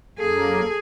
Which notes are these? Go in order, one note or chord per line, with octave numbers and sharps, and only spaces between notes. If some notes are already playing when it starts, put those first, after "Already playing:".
F#2 A#3 G#4 A4